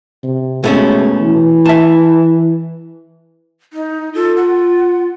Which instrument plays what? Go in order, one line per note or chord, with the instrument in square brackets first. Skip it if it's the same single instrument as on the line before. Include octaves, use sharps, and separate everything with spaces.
[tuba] C3
[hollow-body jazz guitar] B2 A3 C#4 [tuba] G#3
[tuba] E3
[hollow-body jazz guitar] E5 A5
[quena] D#4
[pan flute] F4 [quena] A4
[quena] F#5